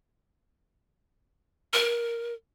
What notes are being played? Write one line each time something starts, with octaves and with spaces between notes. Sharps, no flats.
A#4